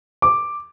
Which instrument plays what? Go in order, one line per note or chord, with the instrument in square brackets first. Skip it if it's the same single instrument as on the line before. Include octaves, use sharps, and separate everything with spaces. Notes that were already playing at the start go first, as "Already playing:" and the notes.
[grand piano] D6